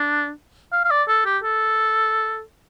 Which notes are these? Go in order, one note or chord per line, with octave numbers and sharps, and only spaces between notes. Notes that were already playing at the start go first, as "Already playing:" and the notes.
Already playing: D4
F5
F5
D5
A4
G4
A4